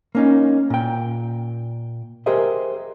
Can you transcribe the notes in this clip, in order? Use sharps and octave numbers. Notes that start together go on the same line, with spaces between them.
A#3 C#4 D#4
A#2 G5
G4 G#4 A#4 C5 D#5 E5